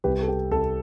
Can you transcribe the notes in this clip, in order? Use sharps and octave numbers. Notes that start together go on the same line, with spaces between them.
C2 G4 B4
A4
G4
C2 A4